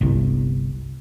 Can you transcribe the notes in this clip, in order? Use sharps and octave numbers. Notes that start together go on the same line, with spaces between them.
G1 C2